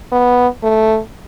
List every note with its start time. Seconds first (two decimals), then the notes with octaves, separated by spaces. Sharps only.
0.12 B3
0.63 A3